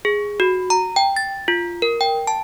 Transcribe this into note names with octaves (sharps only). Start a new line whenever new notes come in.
G#4
F#4
A#5
G5
A6
F4
A#4
G5
A5